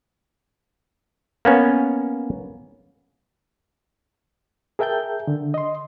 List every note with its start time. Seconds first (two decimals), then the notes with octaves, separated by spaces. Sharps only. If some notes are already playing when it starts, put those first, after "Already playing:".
1.45 A#3 B3 C#4
4.79 G#4 A#4 E5 G5 A5 G6
5.27 D3
5.54 D#5 C6